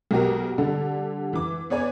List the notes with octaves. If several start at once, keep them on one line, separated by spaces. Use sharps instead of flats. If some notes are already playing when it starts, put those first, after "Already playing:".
B1 B2 F#4 G4 A#4
D3 G3 A4
E3 D6
B3 C#5 D5 G#5